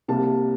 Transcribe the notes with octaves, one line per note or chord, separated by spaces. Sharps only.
C2 C3 G3 A#3 A5